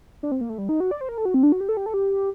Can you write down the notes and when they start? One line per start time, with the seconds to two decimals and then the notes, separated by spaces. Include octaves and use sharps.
0.23 D4
0.32 C4
0.41 A#3
0.49 A3
0.58 G3
0.69 D#4
0.80 F#4
0.91 D5
1.01 C5
1.09 A#4
1.18 A4
1.25 F#4
1.34 C4
1.43 D4
1.52 F#4
1.61 G4
1.69 A4
1.77 G4
1.86 A4
1.94 G4